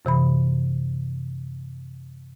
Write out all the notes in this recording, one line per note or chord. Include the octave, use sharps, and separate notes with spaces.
F#2 C3 E3 B5